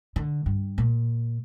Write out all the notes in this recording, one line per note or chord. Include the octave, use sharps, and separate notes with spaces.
D3
G2
A#2